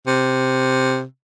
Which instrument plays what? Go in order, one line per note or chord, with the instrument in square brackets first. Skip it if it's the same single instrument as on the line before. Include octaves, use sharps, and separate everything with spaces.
[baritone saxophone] C3